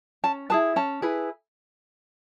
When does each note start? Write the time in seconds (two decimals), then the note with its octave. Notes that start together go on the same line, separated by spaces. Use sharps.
0.24 C#4 A5
0.50 E4 G#4 B4 A5
0.76 C#4 A5
1.02 E4 G#4 B4